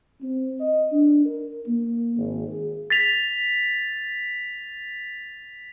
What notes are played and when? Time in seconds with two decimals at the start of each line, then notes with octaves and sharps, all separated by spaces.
0.22 C4
0.60 D#5
0.92 D4
1.25 A#4
1.67 A#3
2.17 G#1
2.47 G#4
2.90 A6 B6 F7